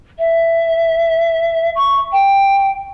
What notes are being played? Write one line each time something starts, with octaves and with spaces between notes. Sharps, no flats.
E5
C#6
G5